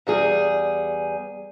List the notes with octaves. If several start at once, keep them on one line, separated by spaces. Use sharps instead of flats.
E2 G3 G#4